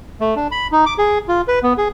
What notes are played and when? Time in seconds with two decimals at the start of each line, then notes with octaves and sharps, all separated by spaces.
0.21 A3
0.36 D4
0.51 B5
0.72 D#4
0.86 D6
0.98 G#4
1.28 F4
1.48 B4
1.63 B3
1.78 G#4